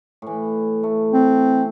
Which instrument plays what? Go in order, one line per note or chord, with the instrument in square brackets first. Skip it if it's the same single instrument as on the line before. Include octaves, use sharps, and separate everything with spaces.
[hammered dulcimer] A2 E3
A3
[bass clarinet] C4